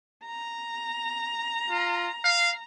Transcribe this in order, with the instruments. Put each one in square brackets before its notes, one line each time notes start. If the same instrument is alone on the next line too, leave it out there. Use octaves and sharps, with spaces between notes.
[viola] A#5
[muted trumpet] F4
F5